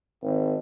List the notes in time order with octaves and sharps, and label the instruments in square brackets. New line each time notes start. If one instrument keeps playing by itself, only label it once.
[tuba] G#1